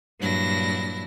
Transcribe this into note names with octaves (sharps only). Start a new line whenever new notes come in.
G2 A#2 F#3 D4 E4 A#6